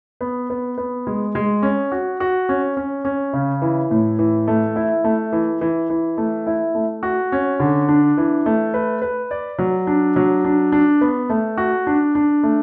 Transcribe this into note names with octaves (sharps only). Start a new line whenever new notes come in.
B3
B3
B3
G#3
G#3
C#4
F#4
F#4
C#4
C#4
C#4
C#3
E3
A2
E3
A3
E4
A3
E3
E3
E3
A3
E4
A3
F#4
C#4
D3
D4
E3
A3
B4
B4
D5
F#3
D4
F#3
D4
D4
B3
A3
F#4
D4
D4
A3